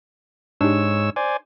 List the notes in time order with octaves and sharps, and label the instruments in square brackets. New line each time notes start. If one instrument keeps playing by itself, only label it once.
[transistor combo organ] G#2 C#5 E6 [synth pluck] D4 D#4 G4
[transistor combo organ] C5 D5 G#5